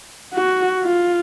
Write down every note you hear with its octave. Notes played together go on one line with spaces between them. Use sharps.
F#4
F4